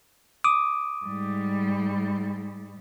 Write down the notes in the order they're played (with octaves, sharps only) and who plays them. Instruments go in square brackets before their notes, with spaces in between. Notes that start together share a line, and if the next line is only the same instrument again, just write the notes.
[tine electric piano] D6 D#6
[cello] G#2 G3